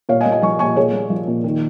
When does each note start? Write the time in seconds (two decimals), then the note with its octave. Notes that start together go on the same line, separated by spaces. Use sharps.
0.09 A#2 C#5 F5
0.21 D#5 G#5
0.26 A#3
0.32 D#5 G#5
0.42 F3 G#5 C#6
0.59 A#2 G#5 C#6
0.76 A#2 G#4 C#5
0.93 A#3
1.10 F3
1.27 A#2
1.44 D#3